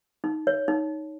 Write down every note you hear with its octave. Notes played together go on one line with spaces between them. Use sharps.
D#4
C#5
D#4